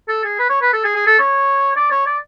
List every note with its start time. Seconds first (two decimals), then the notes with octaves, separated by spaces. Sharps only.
0.08 A4
0.24 G#4
0.39 B4
0.50 C#5
0.62 B4
0.73 A4
0.84 G#4
0.95 G#4
1.07 A4
1.19 C#5
1.76 D5
1.91 C#5
2.06 D5